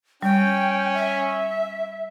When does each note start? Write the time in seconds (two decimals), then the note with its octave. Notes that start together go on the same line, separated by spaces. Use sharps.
0.23 G3 C#4 G5
0.94 E5